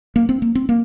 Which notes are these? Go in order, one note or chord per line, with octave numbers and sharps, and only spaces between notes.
A#3
C4
A#3
C4
A#3